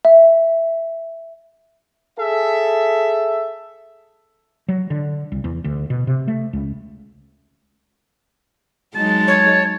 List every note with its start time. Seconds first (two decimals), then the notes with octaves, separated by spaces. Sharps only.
0.05 E5
2.18 G#4 A4 E5
4.68 F#3
4.90 D3
5.32 C2
5.44 E2
5.64 D2
5.90 B2
6.07 C3
6.28 A3
6.53 C#2
8.95 F#3 G#3 D#4 A5
9.27 C#5